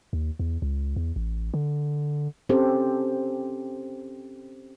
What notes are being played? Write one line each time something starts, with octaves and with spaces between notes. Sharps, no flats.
D#2
E2
C#2
E2
A1
D3
C4 C#4 G4 A4 C5